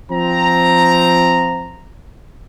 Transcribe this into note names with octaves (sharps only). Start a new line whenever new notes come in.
F3 C4 A#5